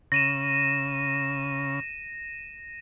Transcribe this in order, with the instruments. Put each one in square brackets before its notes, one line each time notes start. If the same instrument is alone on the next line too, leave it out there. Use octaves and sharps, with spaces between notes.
[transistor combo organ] C#3 [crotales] A#6 D#7 E7